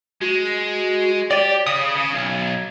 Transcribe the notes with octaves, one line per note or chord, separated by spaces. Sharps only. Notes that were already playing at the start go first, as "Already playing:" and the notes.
G#3 F#4
G4 C#5 D5
C#3 D#6
C#3 G#6
B1